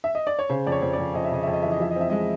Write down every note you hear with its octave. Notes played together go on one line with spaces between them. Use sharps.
E5
D#5
D5
C#5
C#3 C5
F2 D5
C#5
F2
F2 D5
F2 D#5
E5
C#3 D#5
F2 E5
D#5
E3 E5
D#5
F3 E5
D#5
C4 E5
G#3 D#5